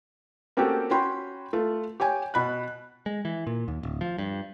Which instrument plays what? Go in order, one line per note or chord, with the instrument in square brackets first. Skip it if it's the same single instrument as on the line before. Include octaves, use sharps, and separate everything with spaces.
[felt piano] A#3 C4 C#4 F#4 G4 A4
C#4 F#4 G5 B5 C6
A3 F4
G4 C#5 G5 G#5
B2 B5 F#6
[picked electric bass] G#3
E3
A#2
D#2
D1
F3
G2